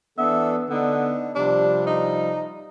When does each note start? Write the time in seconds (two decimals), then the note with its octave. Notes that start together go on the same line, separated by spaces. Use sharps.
0.18 E3 B3 D4 A4 E5
0.70 D3 B3 D4 D#4
1.35 C3 F3 G3 D4
1.87 D#4